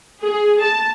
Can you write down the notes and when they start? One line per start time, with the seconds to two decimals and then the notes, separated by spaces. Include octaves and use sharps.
0.22 G#4
0.62 A5